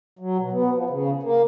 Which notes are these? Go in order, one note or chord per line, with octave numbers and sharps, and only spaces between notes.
F#3
B2
B3
F3
C#3
A#3